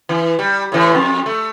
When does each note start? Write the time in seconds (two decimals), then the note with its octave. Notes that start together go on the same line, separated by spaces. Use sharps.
0.09 E3
0.39 G3
0.72 A2 E3
0.95 F2
1.26 A3